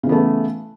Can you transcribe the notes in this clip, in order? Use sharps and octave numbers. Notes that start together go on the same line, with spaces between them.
C#3 E3 A3 B3